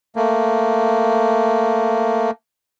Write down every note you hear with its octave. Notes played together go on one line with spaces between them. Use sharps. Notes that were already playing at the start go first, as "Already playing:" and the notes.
A3 A#3